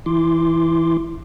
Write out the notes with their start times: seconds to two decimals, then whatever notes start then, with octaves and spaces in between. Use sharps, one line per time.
0.06 E3 E4 C6 D6